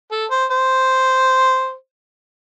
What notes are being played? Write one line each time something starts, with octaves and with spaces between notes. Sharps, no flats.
A4
C5
C5